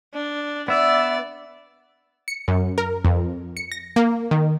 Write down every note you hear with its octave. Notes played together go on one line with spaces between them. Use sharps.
D4
B3 D5 E5
C#7
F#2
A#4
F2
C#7
A#6
A#3
D#3